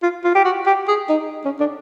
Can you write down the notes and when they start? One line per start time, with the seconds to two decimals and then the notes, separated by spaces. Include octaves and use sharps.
0.02 F4
0.24 F4
0.35 G4
0.45 F#4
0.66 G4
0.88 G#4
1.09 D#4
1.45 C#4
1.60 D4